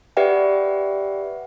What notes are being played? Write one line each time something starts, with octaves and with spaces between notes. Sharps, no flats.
G4 B4 D5 E5 F#5 G5